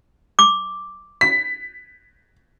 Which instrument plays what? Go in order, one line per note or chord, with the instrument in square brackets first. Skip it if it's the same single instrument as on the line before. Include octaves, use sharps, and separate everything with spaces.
[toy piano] D6
[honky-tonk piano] B6